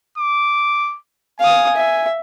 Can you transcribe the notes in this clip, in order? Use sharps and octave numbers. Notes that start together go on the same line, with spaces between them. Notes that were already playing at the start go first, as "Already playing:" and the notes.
D6
F5 G#5 D#6
E5